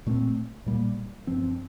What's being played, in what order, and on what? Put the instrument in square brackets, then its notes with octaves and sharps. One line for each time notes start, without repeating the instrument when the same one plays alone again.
[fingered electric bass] A#2 A3 C4
A#2 G3 A#3
G2 F3 C4